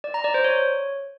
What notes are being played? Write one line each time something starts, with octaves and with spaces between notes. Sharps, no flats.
D5
A#5
D5
C5
C#5